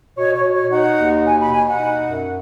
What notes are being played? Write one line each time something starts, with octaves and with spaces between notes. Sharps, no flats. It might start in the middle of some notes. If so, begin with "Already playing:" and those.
B2 C#5
C#5
B2
C#5
D#4 F#5
D#2
B2 G#5
B5
B2 G#5
F#5
D#4
F#2